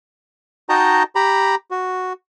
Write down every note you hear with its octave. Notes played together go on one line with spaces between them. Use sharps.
D#4 F#4 D#5 G5 A5 A#5
G4 A#5 B5
F#4